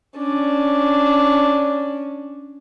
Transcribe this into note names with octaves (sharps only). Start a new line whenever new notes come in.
C#4 D4